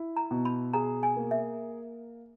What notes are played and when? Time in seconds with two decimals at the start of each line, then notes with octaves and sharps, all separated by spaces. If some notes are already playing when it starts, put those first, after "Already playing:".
Already playing: E4
0.16 A#5
0.31 B2
0.45 B5
0.73 G#4 A#5
1.03 G#5
1.17 A#3
1.31 E5